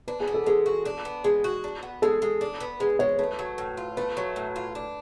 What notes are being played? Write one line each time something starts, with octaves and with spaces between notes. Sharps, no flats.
D4 B4
G#4
B3
A4
G#3 A4
F#4
D4
B3
G#3 G#4
F#4
D4
B3
G#3 A4
G#3
D4
B3
G#3 B4
G#3 C#5
A3 B4
F#3
A2
F4
A3 B4
F#3
A2
F4
D4